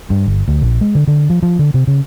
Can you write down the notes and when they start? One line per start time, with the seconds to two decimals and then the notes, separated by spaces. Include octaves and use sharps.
0.10 G2
0.26 G1
0.48 D2
0.62 A#1
0.81 G#3
0.95 D3
1.07 D3
1.30 F3
1.43 F3
1.59 D3
1.74 C3
1.87 C#3